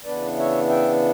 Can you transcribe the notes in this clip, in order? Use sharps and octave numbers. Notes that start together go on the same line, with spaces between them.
C#3 E3 B3 D4 B4 D5
C#5 E5
E5 G5